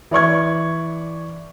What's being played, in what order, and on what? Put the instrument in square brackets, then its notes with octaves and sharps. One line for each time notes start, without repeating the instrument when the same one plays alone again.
[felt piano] E3 D5 C#6 G#6